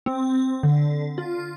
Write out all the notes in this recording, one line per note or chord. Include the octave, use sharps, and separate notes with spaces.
C4
D3
F4